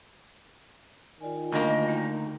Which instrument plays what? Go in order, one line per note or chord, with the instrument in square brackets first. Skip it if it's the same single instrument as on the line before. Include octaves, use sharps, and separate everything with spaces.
[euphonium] D#3 [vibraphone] F4 D5 G#5
[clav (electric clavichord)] D2 A#3 [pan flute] D#5
[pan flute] D#4